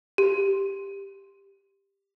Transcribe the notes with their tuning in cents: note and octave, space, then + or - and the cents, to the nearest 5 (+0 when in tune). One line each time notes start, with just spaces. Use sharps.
G4 +10